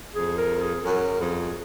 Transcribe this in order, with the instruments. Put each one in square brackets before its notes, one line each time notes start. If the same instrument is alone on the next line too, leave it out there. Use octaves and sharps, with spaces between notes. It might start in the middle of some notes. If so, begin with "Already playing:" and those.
[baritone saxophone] F2 [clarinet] G#4
[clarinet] A#4
G#4
[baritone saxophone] F#2 [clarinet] A#4
[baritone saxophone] F2 [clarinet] G#4